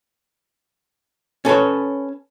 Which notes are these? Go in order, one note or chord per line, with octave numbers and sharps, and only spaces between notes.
C#4 A4 B4 C#5